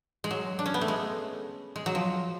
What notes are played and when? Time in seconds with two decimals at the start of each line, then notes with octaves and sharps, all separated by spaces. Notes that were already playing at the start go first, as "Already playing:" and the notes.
0.24 G#3
0.31 F#3
0.59 D4
0.66 C#4
0.74 B3
0.81 A3
0.88 G#3
1.76 G#3
1.86 F#3
1.95 F3